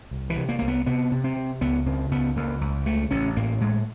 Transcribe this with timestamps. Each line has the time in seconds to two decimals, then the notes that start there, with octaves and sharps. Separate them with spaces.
0.11 C2
0.30 E3
0.37 C3
0.49 A#3
0.59 C2 A#3
0.68 B3
0.86 C3 B3
1.11 C3
1.24 C4
1.36 C3
1.61 C#2 B3
1.86 C#3 C4
2.11 C#2 B3
2.36 C#2 A#3
2.61 C#2
2.86 C#3 A3
3.11 A1 C#4
3.37 A2 A#3
3.61 A2 G#3